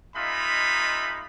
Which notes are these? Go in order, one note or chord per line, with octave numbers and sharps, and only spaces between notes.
G#3 A#3 D#4 F4 E5 B5